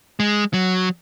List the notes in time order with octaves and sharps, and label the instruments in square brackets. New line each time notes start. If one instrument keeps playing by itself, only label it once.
[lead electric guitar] G#3
F#3